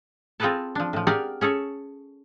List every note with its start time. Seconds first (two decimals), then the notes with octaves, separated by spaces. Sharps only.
0.40 C4 F4 G#4 A4 B4 A5
0.75 F3 D4
0.93 A2 F3
1.07 G4 G#4 A#4 D5 F5 F#5
1.41 C#4 G#4 A4 C#5